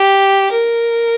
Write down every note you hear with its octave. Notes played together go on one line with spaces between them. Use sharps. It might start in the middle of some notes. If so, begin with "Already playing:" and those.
Already playing: G4
A#4